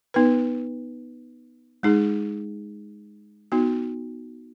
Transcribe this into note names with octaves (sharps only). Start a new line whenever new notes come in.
B3 D#4 B4
G#3 D#4 G#4
B3 D#4 F#4